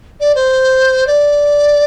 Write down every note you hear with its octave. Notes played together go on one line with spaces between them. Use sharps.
D5
C5
D5